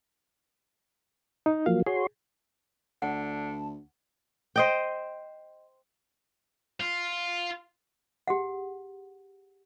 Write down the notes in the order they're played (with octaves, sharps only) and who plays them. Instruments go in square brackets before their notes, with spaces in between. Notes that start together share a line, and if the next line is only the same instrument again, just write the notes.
[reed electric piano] D#4
[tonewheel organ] F3 F#3 A#3 [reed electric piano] F5
[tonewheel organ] F#4 C#5 C6 [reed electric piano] G#4
[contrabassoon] D2 [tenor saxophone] D3 [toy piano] F#5 [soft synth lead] A5
[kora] C5 D#5 G5
[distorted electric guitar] F4
[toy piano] G4 G#4 F#5